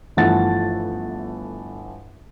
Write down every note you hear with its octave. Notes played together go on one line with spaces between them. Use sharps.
G1 E3 F3 A3 F#5 A6